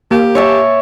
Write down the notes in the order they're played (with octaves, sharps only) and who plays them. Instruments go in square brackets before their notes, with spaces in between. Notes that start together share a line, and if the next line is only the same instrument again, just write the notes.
[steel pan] A#3 [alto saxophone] G4
[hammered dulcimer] C#5 E5 A5